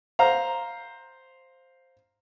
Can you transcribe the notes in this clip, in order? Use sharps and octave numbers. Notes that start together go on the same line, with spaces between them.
C5 F5 A#5